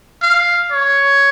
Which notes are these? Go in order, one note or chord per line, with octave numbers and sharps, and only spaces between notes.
F5
C#5